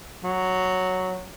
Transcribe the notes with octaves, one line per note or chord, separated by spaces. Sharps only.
F#3